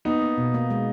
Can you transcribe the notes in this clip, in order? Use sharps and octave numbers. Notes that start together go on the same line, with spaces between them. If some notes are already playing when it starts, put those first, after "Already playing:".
A#3 B3 D#4
A#3
B2
A#3
G#3